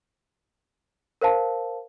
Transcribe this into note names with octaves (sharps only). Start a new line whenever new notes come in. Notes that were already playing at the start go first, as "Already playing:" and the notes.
A#4 C5 F5 A5